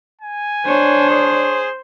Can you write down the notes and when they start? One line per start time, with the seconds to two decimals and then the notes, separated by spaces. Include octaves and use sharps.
0.21 G#5
0.66 D4 C5 C#5
1.10 G#4